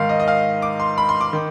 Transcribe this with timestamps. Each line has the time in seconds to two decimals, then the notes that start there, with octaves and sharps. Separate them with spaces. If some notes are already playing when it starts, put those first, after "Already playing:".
Already playing: G#2 D#3 F5
0.09 D#5
0.20 D#5
0.28 F5
0.62 D6
0.80 C6
0.98 B5
1.09 C6
1.21 D6
1.33 D#3